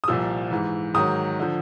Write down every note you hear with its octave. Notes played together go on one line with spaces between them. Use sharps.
D#6
C2 A#2 F3 E6
G#2 E3
G#2 D#3 F#3 D#6
D3 F3